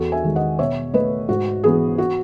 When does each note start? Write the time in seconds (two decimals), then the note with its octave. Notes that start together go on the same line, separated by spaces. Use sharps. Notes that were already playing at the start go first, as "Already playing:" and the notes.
Already playing: E2 F#4 A4
0.12 E5 G#5
0.24 D#3 G#3
0.36 D#5 F#5
0.59 B2 C#5 E5
0.94 A3 B4 D#5
1.29 G#2 F#4
1.64 E3 B3 G#4
1.98 F#4